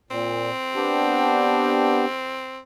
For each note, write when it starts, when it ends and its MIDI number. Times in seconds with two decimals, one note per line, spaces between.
0.11 0.51 46
0.11 2.60 60
0.75 2.05 59
0.75 2.05 62
0.75 2.05 67